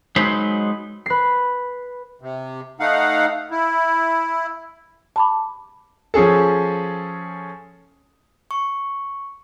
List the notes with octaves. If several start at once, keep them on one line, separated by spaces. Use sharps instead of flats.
F#3 G#3 D#4 B4 C5
B4 C7
C3
A3 D#4 F5 F#5
E4
A5 B5 D6
F3 C#4 G#4 A4
C#6